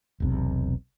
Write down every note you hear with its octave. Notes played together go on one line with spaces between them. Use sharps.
E1 B1 C3